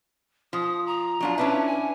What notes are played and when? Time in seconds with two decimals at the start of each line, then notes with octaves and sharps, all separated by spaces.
0.53 F3 D#6
0.86 A#5
1.20 F#3 D4 F4
1.38 C#4 D4 E4 B4
1.67 G#5